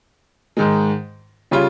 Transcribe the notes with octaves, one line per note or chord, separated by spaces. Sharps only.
G#2 D#3 G#3
C#3 G3 C#4 F4